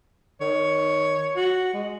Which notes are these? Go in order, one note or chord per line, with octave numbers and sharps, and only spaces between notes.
D#3 C#5
F#4
G#3